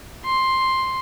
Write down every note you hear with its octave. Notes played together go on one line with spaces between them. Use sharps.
C6